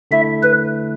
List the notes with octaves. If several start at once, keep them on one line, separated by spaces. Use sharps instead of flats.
D3 A3 E4 E5
B4